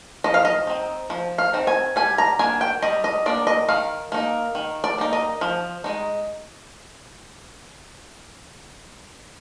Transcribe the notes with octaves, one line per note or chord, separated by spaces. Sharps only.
F3 D#5
F5
D#5
C4 D#4
F3
F5
C4 D#4
G#5
G3 G#5
A#5
A#3 D4 G#5
G5
G3 D#5
D#5
A#3 D4 D5
D#5
D#3 F5
A#3 D#4
D#3
D5
A#3 D#4
D#5
F3
G#3 D#4